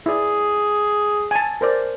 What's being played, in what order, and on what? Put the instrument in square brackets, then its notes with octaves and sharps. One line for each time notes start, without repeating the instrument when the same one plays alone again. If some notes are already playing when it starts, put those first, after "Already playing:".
[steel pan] E4 D5 [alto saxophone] G#4
[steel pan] G#5 A5
A#4 C5 D5